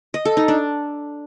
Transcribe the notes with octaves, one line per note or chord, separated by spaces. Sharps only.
D#5
A4
D#4
D4